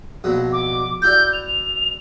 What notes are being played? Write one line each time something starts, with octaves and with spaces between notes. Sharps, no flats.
A#1 B2 F#3
D6
E4 F#4 D5 G6
F7